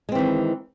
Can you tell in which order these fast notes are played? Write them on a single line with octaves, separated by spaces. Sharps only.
G#3 C4 E3 D#3